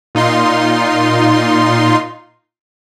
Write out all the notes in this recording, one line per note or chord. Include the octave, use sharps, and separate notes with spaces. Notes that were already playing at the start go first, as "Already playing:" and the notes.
A#2 D#4 F4 C6